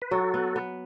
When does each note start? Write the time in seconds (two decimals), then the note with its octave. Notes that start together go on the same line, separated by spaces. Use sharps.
0.02 B4
0.11 F#3 F#4 A4
0.34 B3
0.56 B3